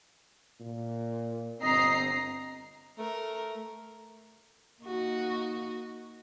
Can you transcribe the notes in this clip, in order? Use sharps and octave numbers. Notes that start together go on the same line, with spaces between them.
A#2
G1 C4 D#5 A#5 C7
A3 A#4
A#3 D#4 F#4